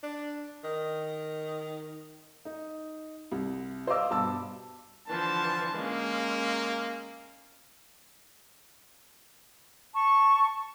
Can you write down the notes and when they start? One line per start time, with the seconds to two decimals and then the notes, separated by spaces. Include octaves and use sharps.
0.03 D4
0.64 D#3
2.45 D#4
3.32 C2
3.87 C5 D5 D#5 F5 D6 E6
4.11 G2 B2 A5 E6
5.07 D3 E3 F3 A5
5.74 G#3 A#3 C#4
9.93 A5 C#6